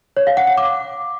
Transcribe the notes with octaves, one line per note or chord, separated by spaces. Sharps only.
C#5
F5
F#5
F#5
D6